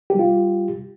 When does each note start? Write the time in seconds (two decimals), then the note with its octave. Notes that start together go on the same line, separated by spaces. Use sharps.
0.10 G4
0.15 G3
0.19 F4